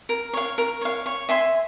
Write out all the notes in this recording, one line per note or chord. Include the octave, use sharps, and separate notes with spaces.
A#4
C#5 F5
A#4
C#5 F5
C#5
E5 G#5 C6